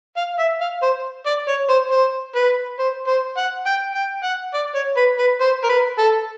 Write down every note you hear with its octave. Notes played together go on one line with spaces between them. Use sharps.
F5
E5
F5
C5
D5
C#5
C5
C5
B4
C5
C5
F#5
G5
G5
F#5
D5
C#5
B4
B4
C5
A#4
B4
A4